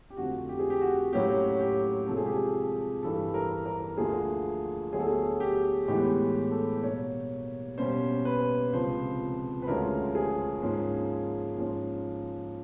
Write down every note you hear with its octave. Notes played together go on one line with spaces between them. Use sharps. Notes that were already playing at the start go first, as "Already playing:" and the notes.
G4
F2 D3 F3 A3 C4 F#4
G4
G#4
G4
F#4
A2 F#3 A#3 C#4 G4
G4
C3 F3 G#3 A4
G#4
G4
G#4
G2 E3 G3 A4
A#4
A#4
D2 D3 F3 A#3 G#4
D2 D3 F#3 B3 G#4
A4
G#4
G4
A2 E3 G#3 B3 G4
A4
B2 G3 A#3 C#5
B2 G3 A#3 C#4 C5
B4
C#2 C3 F3 C5
B4
D2 D3 F3 G#3 C#4 A#4
G#4
G#2 F3 A#3 C#4
G#2 F3 A#3 C#4